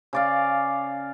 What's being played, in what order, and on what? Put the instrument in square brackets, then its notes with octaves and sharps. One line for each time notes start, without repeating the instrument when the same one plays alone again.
[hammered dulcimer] C#3 D5 F5